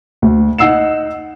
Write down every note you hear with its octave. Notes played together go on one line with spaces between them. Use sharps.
D2
D#4 F#5 E6 C7 E7